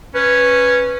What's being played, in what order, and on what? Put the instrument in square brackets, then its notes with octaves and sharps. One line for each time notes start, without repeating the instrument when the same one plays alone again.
[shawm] C#4 [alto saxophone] B4